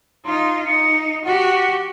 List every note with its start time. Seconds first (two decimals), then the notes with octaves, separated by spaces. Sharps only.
0.25 D#4 F4 C6
0.66 D#4 C#7
1.25 F#4 G4 F#5